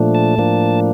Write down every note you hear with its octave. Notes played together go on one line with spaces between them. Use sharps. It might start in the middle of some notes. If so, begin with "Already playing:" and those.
Already playing: A#2 F3 A3 D4
A5
A2 F3 A#3 D4